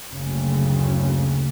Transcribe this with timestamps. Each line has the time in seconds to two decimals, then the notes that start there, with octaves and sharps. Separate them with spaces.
0.11 F#1 D2 C#3